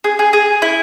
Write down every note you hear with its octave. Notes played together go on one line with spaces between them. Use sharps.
G#4
G#4
G#4
E4